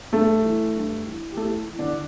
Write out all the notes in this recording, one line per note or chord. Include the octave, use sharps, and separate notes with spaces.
G2 A3 A4
E3
G2
E3
G4
A2 A3 A4
E3
D3 D4